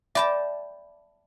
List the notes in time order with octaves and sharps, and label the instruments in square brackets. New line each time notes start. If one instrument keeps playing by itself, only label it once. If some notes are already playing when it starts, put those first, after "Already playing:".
[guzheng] D5 G5 A5 [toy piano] E5 B5